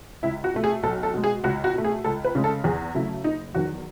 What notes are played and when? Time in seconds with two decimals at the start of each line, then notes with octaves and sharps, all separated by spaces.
0.23 C#2 E4
0.44 F#4
0.54 B2 A3
0.64 G#4
0.83 B1 A4
1.03 A4
1.14 B2 G#3
1.24 G#4
1.44 C#2 F#4
1.64 F#4
1.74 B2 A3
1.84 G#4
2.04 C#2 A4
2.25 B4
2.35 C#3 G#3
2.44 A4
2.64 E2 G#4
2.94 C#3 F#3 A3 E4
3.24 F#1 D#4
3.55 E2 D#3 F#3 F#4